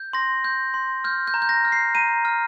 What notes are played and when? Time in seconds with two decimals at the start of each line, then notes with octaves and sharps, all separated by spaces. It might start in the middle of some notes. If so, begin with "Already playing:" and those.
Already playing: G6
0.13 C6 A#6
0.44 G6
0.74 C6
1.04 F6 G6
1.27 G6
1.34 A#5
1.42 G6
1.49 A#6
1.65 F6
1.72 C7
1.95 A#5 D#7
2.25 F6